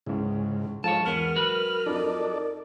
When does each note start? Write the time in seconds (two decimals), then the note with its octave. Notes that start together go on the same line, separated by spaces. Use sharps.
0.06 C#2 G#2 C#3 E4
0.84 G#2 F3 A4 C#5 F5 A5
1.05 E2 B3 A#4 F6
1.36 F#3 B4
1.86 F2 F3 D#4 A4 D5